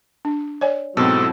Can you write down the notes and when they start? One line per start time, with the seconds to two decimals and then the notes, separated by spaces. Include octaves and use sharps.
0.25 D4
0.61 C#5 D5 G#5
0.97 G#2 B2 F#3 C4 E4 A4